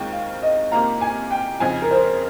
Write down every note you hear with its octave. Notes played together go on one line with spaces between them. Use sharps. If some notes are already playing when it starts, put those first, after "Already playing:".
Already playing: D#2 D#3 G#3 C4 F4 G5
F5
D#5
C3 D#3 A#3 F4 A#5
G#5
G5
F2 C#3 F3 C4 D#4 G#5
A#4
C5